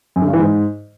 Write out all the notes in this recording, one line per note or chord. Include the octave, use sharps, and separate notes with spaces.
F#2
D3
G2
E3
G#2